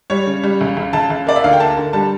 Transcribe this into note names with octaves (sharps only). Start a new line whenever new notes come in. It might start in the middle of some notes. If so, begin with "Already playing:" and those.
G3 C#5
C#3
G3
C#2
C#2
C#2 A5
C#2
A#3 D5
E5
D2 F5
G5
A#3 A5
D3
G3 A5